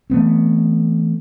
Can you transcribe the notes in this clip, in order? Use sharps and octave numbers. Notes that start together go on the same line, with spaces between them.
E3 A3 B3 C4